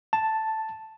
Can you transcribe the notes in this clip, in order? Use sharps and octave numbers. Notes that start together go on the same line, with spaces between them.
A5